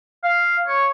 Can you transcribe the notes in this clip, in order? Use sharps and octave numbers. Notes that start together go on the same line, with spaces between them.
F5
C#5